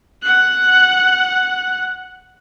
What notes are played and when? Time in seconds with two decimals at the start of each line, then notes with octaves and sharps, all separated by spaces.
0.22 F#5 F#6